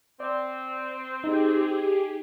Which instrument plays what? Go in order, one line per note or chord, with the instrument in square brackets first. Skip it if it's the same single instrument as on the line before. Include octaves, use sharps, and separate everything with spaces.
[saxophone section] C4 [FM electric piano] D5
[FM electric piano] D#4 [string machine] G4 G#4